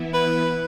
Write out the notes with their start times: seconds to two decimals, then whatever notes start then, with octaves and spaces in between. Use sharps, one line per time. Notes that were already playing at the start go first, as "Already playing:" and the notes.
Already playing: E3 B3 E4
0.14 B4